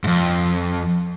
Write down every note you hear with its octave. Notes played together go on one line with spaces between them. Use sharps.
F2 G#2